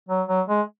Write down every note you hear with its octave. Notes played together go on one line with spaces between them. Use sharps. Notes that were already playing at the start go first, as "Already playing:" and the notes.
F#3
F#3
G#3